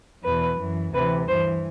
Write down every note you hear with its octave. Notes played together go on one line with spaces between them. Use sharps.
E2 B2 B4
F#2 E3
D2 C3 E3 B4
G2 E3 C5